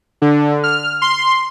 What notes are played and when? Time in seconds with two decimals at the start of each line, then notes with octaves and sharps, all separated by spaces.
0.22 D3
0.64 F6
1.02 C6